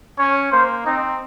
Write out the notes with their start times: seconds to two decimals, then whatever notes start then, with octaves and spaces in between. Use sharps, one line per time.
0.18 C#4 C#5
0.52 A#3 C5
0.86 C4 D#4